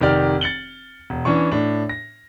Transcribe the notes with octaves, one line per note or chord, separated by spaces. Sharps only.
F1 D#3 G4 D5 F6
A6 C#7 F#7 G7
E1
E3 C#4 D4 C#6
A2 D4
A#6